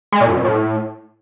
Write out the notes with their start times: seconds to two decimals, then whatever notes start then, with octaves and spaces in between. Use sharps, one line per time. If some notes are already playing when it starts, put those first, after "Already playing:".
0.12 G#3
0.20 A#2
0.29 F#2
0.37 B2
0.45 A2